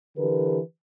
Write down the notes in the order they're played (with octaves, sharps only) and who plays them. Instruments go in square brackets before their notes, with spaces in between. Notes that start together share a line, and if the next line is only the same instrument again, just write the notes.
[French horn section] D3 E3 G4 A#4 B4